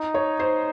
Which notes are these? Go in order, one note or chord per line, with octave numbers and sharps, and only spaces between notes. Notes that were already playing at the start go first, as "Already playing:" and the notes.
Already playing: D#4
C#5
C5